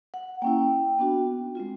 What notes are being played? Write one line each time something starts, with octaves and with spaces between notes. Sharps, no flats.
F#5
A#3 C#4 E4 G5
B3 D4 F#4
G#3 C4 F4